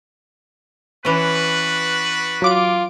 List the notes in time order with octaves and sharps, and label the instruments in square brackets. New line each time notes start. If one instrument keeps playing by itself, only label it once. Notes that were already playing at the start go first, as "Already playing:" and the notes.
[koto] E3 C#4 [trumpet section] D4 F#4 B4
[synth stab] F#3 D6 D7 [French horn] F4